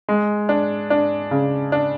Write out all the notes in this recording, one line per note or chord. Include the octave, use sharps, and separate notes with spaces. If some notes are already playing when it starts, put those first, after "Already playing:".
G#3
D4
D4
C#3
D4